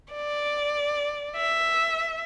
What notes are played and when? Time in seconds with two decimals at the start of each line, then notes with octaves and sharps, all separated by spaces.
0.13 D5
1.36 E5